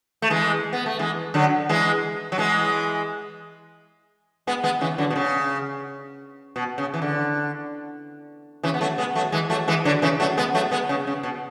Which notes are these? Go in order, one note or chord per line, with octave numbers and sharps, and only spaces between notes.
A3
E3 G#3
B3
A3
E3 G#3
D3 F#3
E3 G#3
F#3
E3 G#3
G#3 B3
G#3 B3
C#3 E3
D3 F#3
B2
C#3
B2
C#3
E3
D3
C#3 E3
B3
F#3 A3
G#3 B3
F#3 A3
E3 G#3
F#3 A3
E3 G#3
D3 F#3
C#3 E3
F#3 A3
G#3 B3
F#3 A3
G#3 B3
C#3
C#3
B2